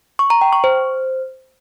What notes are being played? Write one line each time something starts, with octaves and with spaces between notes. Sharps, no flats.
C#6
A#5
G5
C#6
C5